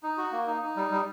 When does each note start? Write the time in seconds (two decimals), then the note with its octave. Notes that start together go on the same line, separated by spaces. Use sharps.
0.03 D#4
0.18 F#4
0.32 A#3
0.47 D#4
0.62 D#4
0.76 G3
0.91 G3